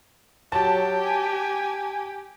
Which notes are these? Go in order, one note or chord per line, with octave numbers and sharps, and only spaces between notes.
F#3 G4 A5
G#5